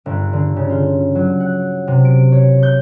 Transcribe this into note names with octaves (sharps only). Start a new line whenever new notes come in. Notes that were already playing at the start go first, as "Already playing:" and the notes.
G1
D3
C#3
F4
F#3
F#5
C3
D7
C#5
G6